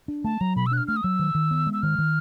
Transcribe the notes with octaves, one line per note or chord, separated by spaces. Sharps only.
D4
A3 A5
F#3 A#5
B2 B5
E6
D4 F#6
F6
A3 F6
D#6
F#3 E6
D#3
D#3
B3
G#3
E6
D#3 F6
D#3